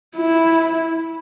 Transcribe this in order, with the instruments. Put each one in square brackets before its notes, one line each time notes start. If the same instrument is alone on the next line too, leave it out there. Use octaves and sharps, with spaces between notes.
[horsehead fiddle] E4